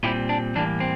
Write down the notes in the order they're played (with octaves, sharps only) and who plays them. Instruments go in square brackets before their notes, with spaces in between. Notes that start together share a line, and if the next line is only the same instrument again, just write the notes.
[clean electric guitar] A#2 G3 C4 E4 G4
D4
A2 E3 G3 A#3 D4
C4